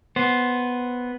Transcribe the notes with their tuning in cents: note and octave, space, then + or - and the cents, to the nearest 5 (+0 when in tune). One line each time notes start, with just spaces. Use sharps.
B3 +0 C5 +0